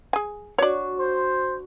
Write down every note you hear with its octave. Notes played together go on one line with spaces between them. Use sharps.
G#4 G#5
D4 F#4 C#5 D5
C5